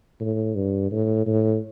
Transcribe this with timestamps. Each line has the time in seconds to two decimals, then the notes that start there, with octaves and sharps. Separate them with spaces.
0.20 A2
0.55 G2
0.91 A2
1.26 A2